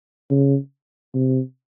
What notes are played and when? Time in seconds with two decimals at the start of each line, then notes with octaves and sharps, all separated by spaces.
0.30 C#3
1.14 C3